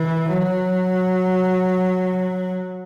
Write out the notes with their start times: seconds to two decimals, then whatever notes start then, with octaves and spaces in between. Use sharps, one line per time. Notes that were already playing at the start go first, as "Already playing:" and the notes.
Already playing: E3
0.28 F#3